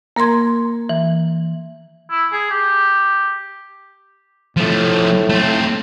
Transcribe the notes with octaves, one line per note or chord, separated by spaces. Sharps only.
A#3 A#4 A#5 C6 G#6
E3
E4
G#4
G4
A2 F3 A3
A3 C4